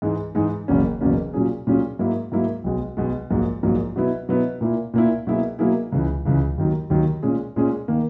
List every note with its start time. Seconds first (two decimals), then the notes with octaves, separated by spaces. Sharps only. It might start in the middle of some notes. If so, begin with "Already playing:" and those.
0.02 G#2 E3 G#3 D#4 G#4
0.35 G#2 E3 G#3 D#4 G#4
0.68 F#1 E2 B2 A#3 C#4
1.01 F#1 E2 B2 A#3 C#4
1.34 A#2 F#3 C#4 G#4
1.67 A#2 F#3 C#4 G#4
1.99 G#2 F#3 A#3 E4
2.32 G#2 F#3 A#3 E4
2.64 B1 B2 G#3
2.97 B1 B2 G#3
3.30 A#1 G#2 F#3 A#3
3.63 A#1 G#2 F#3 A#3
3.96 B2 F#3 B3 E4
4.29 B2 F#3 B3 E4
4.61 A#2 A#3 E4
4.94 A#2 A#3 E4
5.27 B2 F#3 A#3 E4 G#4
5.59 B2 F#3 A#3 E4 G#4
5.92 C#2 C#3 E3
6.25 C#2 C#3 E3
6.58 D#2 D#3 F#3
6.90 D#2 D#3 F#3
7.23 A#2 G#3 C#4 G#4
7.56 A#2 G#3 C#4 G#4
7.88 D#3 A#3